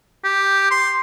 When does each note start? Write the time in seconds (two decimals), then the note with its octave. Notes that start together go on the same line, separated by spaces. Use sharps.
0.24 G4
0.71 C6